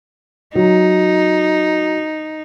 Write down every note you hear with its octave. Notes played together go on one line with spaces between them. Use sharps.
F#3 D#4